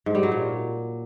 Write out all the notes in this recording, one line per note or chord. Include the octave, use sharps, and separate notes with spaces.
G#2
G3
F#3
A#2